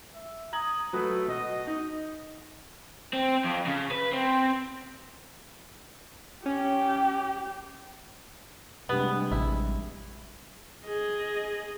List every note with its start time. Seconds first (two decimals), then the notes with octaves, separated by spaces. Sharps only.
0.15 E5
0.53 A#5 D#6 G#6 F#7
0.93 F#3 A3 B4 D#6
1.28 B2 F#4 D#5
1.67 D#4
3.13 C4
3.44 F2
3.66 C#3
3.91 B4
4.12 C4
6.46 C#4 G4
8.89 F1 G3 G#3 B3 D4 G4 F#7
9.31 A1 E4
10.87 G#4 D#5